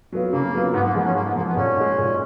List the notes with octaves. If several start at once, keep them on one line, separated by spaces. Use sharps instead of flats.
F#3 B3 F4
C#3 A#3
F#3 B3 F4
G#2 B3
A#3
F3 G#3 B3
C#4
G#2 A#3
B3
F3 G#3 A#3
B3
A#2 C#4
G#3 D#4
A#2